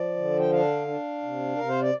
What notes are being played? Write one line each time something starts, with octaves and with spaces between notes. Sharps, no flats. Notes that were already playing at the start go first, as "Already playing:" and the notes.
Already playing: F3 D5
D3
G5
D4 F5
D4
C3
C3 A#4
C5
D5